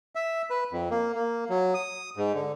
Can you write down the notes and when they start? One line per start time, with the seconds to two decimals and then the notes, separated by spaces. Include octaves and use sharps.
0.15 E5
0.50 B4
0.72 F2
0.91 A#3
1.15 A#3
1.50 F#3
1.74 D#6
2.17 G#2
2.35 D3